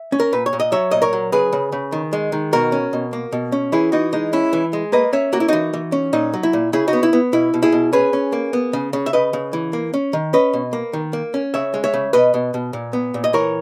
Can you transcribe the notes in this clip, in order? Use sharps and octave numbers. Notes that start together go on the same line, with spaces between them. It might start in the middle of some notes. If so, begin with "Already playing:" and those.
Already playing: E5
C#4
A#4
A#2 B4
C#5
A#2
D#5
F#3 C#5 E5
A#2 D#5
A#4 C#5
F#3
C#3 G#4 B4
C#3
C#3
D#3
G#3
D#3
B2 F#4 A#4
C#4
B2
A#3
B2
C#4
E3 E4 G#4
E3 D#4 F#4
G#3 D#4
C#4 E4
E3
G#3
A#3 B4 D#5
C#4 C#5 E5
A#3 F#4
E4
E3 D#4 F#4
E3
C#4
A#2 D#4
F#3
E4
A#2
C#3 E4 G#4
D#4 F#4
B3
E4
B3
B2 E4
B2
E4 G#4
B2
C#4 G#4 B4
C#4
A#3
B3
C#3
C#3
E5
C#3 B4 D#5
C#3
E3
A#3
C#4
D#3
C#4 B4 D#5
B2
A#3
D#3
A#3
C#4
C#3 C#5 E5
G#3
C#5 E5
C#3
B2 B4 D#5
B2
B2
A#2
B3
A#2
D#5
E3 A#4 C#5